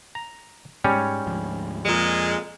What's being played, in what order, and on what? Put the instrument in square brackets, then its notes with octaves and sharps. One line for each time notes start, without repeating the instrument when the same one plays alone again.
[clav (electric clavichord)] A#5
[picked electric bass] G#2 [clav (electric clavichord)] G3 C#4 C#5
[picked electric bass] D2 G#2 F3
[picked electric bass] F2 [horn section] A#2 G#3